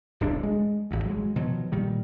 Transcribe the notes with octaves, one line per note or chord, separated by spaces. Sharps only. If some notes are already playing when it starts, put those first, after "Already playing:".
D1 B1 D4
G#3
G#1 D2
F#3 G#3
B2 D#3 F3 F#3
A#2 D#3 G3